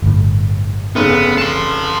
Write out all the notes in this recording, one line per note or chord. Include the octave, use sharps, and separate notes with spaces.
G1 A2
F1 C#3 B3
A5 C6